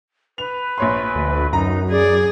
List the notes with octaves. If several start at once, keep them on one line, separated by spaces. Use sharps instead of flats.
B4 F7
A#1 C#5 C6
D2
F#2 D#4 A#5
G#4 D5